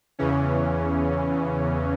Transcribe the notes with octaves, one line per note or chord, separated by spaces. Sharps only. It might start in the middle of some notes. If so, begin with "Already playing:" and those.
E2 C#3 E3 C#4